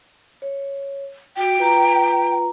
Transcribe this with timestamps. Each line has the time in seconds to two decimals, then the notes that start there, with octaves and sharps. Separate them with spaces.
0.42 C#5
1.37 F#4 G5
1.58 F4 B4 A#5